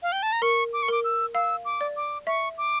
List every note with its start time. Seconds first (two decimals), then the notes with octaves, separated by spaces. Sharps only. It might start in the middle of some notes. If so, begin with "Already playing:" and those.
0.02 F5
0.12 G5
0.23 A5
0.32 A#5
0.42 A#4 C#6
0.73 D6
0.83 C#6
0.88 A#4 D6
1.04 E6
1.34 F5 E6
1.65 D6
1.81 D5
1.97 D6
2.27 E5 C#6
2.58 D6